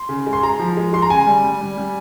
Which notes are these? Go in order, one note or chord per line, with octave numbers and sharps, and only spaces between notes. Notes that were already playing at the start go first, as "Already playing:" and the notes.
Already playing: C6
C#3
G#3
C6
G#3 A#5
F3
G#3
G#3 C6
A#5
C#3 G#5
G3
G3
G3
G3